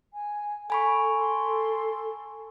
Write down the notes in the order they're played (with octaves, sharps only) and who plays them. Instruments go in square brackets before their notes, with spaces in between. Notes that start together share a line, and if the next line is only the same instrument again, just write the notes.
[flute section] G#5
[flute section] A4 [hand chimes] G#5 B5 C#6
[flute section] A4 C6